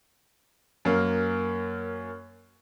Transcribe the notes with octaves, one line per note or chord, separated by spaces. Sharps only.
F#2 A#3